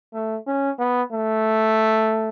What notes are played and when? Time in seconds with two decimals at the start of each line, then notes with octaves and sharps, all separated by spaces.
0.14 A3
0.47 C#4
0.79 B3
1.12 A3